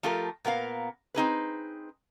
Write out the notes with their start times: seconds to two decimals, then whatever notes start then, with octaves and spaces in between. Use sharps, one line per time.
0.03 F3 A3 F4 G4 A4 A#4
0.45 A#2 B3 A#4 F5
1.14 C4 D#4 G#4 B4